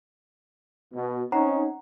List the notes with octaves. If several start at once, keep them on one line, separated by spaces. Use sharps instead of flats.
B2
C4 C#4 D#4 C5 F#5 A#5